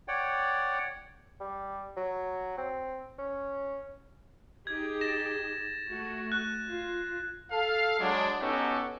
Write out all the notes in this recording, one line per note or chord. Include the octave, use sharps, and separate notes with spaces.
C#5 D5 F#5 G5
G3
F#3
C4
C#4
D#4 G4 G#4 G#6
A6 A#6 E7
A3 F#4
F#6
F4
A4 F5
F#3 G#3 D4
B3 C#4 D#4 F#4 G4 A4